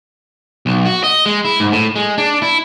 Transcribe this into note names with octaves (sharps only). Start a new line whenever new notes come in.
B1
F#4
D#5
G#3
E4
G#2
A2
G#3
D4
E4